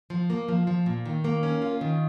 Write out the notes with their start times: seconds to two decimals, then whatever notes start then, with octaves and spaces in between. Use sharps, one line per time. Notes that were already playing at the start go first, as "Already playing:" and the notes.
0.10 F3
0.30 A#3
0.48 F3
0.67 F3
0.86 A#2
1.06 D#3
1.24 A#3
1.43 C#4
1.62 F4
1.81 D#3